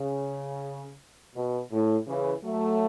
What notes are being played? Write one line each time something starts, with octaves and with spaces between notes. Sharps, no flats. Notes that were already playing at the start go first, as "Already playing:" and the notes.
Already playing: C#3
B2
A2
C#3 E3
F#3 A3